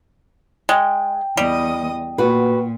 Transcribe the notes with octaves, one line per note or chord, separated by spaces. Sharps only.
G#3 G5
E2 G3 D#5 D#6
A#2 F#4 B4